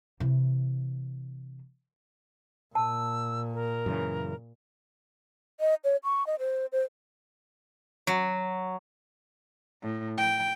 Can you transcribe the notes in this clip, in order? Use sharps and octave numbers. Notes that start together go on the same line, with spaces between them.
C3 E3
A#2 A5 E6
A#4
F#2 C#3 E3
D#5
C#5
C#6
D#5
C5
C5
F#3
A2
G5